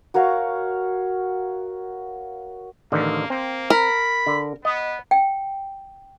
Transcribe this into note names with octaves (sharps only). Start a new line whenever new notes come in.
F#4 A#4 C#5 F5
A1 D3 D#3 A#3
A#3 C4
A#4 B5
D3
B3 D#5
G5